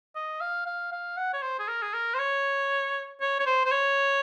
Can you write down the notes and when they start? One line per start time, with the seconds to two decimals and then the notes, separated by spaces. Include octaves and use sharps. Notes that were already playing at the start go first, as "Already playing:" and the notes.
0.16 D#5
0.41 F5
0.66 F5
0.92 F5
1.17 F#5
1.33 C#5
1.42 C5
1.59 G#4
1.68 A#4
1.82 G#4
1.94 A#4
2.14 C5
2.19 C#5
3.21 C#5
3.40 C#5
3.46 C5
3.65 C5
3.72 C#5